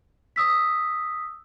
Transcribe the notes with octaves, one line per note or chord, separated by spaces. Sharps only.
D#6 E6 B6